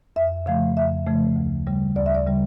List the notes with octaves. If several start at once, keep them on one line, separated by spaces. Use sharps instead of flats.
F2 E5
C#3 F3 A3 F5
F2 E5
C#3 F3 A3
D2
C#3 G3
D2 D5
E5
D5
C#3 G3